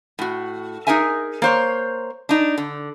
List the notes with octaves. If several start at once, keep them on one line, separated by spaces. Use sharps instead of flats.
A2 F#4
D#4 G#4 A#4 E5 G#5
A#3 C5 C#5
D4 D#4
D3